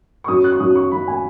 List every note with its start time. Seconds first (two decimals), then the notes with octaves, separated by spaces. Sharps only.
0.24 C#6
0.28 F#2 D#6
0.44 F#6
0.52 C#6
0.60 F#2 D#6
0.75 C#6
0.91 F#2 B5
1.08 G#5